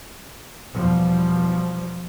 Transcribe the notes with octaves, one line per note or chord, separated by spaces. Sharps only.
E2 B2 F3 G3